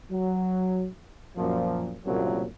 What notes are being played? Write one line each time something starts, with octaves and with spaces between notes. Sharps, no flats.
F#3
F#2 A#2 F3
C2 A#2 C#3 F3 F#3 A#3